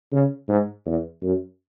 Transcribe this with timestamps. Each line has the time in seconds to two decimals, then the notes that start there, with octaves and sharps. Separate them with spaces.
0.12 C#3
0.48 G#2
0.86 E2
1.22 F#2